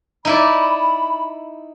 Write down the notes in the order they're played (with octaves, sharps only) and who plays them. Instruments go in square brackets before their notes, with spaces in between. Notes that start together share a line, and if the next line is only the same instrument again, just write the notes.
[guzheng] D#4 E4 D5 [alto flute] B5